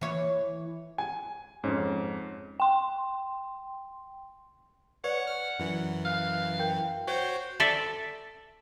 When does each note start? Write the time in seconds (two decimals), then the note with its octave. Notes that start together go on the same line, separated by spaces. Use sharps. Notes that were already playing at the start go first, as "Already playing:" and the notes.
0.01 E3 C#5
0.98 G#5
1.64 F2 G#2 C#4
2.60 G5 C6
5.04 B4 C#5 D5 F#5
5.27 F6
5.59 F#2 E3
6.05 F5 F6 F#6
6.59 A#4 G5 G6
7.07 F#4 C5 C#5 G5
7.60 A4 D5 E5